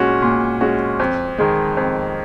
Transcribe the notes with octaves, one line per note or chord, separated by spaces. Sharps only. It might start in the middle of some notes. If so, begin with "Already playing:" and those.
Already playing: A#2 G#3 C#4 F#4
A#2
G#3 C#4 F#4
F2
D#3 G#3
F2